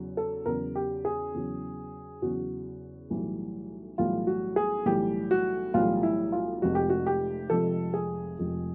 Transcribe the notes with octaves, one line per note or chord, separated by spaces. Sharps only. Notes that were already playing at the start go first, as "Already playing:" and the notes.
Already playing: E2 C#3 F#3
A4
E2 C#3 F#3 A#4
G4
G#4
E2 C#3 F#3
E2 C#3 F#3 F#4
B1 A2 E3 G3
B1 A2 E3 G3 F4
F#4
G#4
B1 A2 E3 G3 G4
F#4
B1 A2 E3 G3 F4
E4
F4
F1 F2 C3 F3 G#3 F#4
G4
F#4
G4
F1 F2 C3 F3 G#3 A4
G#4
F1 F2 C3 F3 G#3